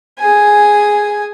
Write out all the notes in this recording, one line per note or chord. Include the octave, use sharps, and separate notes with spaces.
G#4 G#5